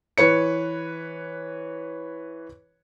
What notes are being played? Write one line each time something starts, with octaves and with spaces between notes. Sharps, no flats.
E3 B4 C#5 C#7